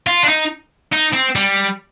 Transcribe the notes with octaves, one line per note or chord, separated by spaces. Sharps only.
F4
D4
D#4
D#4
C4
G3